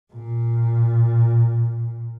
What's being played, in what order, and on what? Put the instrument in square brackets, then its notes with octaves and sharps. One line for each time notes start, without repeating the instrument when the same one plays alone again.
[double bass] A#2